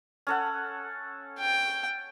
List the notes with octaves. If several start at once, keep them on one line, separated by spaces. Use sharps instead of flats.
C#4 A4 F#5
G5